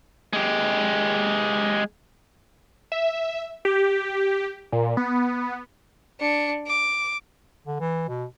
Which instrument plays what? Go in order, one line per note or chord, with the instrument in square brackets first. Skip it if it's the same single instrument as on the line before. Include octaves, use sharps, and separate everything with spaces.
[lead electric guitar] G#3 G4
[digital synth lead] E5
G4
A#2
B3
[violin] D4 C#7
D6
[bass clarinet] D3
E3
B2